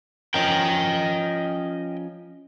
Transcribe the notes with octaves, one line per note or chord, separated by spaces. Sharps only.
F3 C#4 A#4 D#5 G5